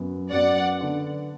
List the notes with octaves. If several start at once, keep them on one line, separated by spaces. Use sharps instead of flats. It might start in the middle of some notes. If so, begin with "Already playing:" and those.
Already playing: F#2 F#3 B3
F#2 F#3 B3 D5 F#5
D3 B3 D4